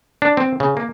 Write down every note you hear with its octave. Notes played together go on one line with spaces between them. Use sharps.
D4
C4
C#3
A#3